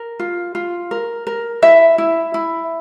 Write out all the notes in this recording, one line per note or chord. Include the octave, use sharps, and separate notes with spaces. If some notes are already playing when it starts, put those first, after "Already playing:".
Already playing: A#4
F4
F4
A#4
A#4
E4 E5
E4
E4